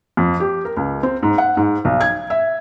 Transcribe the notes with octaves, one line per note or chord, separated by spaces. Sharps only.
F2
G4
A#4
C#2
C4
G#2
F#5
G#2
B1
G#6
E5